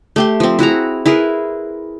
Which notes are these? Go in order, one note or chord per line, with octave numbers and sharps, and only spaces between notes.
A3 G4 C6
F3 C4
E4 F#4 G#4 A#5
E4 G#4 A#4 B4